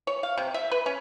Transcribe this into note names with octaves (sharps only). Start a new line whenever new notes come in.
C#5
F5
C3
E5
B4
C#4